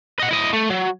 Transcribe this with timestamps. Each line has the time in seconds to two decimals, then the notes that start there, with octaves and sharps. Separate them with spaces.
0.19 D#5 F#5
0.31 E4 D#5
0.53 A3
0.70 F#3